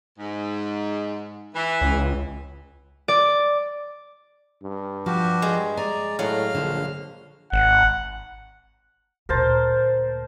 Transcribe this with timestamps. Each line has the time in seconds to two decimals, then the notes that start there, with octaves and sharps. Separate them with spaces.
0.18 G#2
1.55 E3
1.81 C#2
3.08 D5
4.63 G2
5.06 F3 F#4 G4
5.42 G#3
5.77 D5 G#5 A#5
6.19 A2 F#3 F5 F6
6.55 A#1 D3
7.52 G#1 F#5
9.29 D2 A#2 A#4 C5 A5